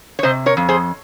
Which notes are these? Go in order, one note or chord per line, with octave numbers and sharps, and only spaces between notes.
C#5
C3 C5 D#5
A#4 C#5
F2
G#4 C5